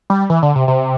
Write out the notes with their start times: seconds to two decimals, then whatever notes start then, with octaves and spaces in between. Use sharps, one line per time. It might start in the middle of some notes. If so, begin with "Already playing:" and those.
0.10 G3
0.30 E3
0.43 D3
0.55 C3
0.68 C3